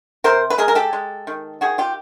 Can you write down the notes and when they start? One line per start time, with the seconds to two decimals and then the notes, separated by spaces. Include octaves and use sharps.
0.24 C3 A#4 C5
0.50 B4
0.58 G#3 G#4 A#4
0.68 A#4
0.75 G4 A4
0.93 G#3
1.27 D#3
1.61 D#3 F#4 G#4
1.78 F4 G4